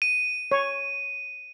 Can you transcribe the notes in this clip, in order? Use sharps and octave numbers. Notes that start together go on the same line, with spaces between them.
D#7
C#5